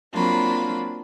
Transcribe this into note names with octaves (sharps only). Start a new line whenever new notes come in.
F#3 A#3 C4 D4 F4 B5